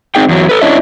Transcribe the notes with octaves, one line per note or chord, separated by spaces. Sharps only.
C4 D#4 G#4 G5
E2 F#3
A4 B4
C#4 D4 E4 C#5 D#5 E5